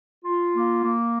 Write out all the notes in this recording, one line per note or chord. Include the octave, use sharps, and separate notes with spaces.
F4
A#3
A#3